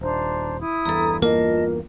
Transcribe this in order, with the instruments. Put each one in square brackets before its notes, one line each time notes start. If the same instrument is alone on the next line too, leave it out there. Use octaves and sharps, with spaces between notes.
[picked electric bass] D#1 [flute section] D4 C5 A#5
[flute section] E4 D#6
[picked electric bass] E2 G2 E3 [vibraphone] A4 A#5
[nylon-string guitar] A#3 [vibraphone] F4 [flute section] D#5 A5